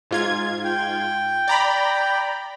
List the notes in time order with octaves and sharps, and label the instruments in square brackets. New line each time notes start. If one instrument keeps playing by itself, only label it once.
[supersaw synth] G#2 F4 G#6
[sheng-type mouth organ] G5
[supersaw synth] D5 A#5 B5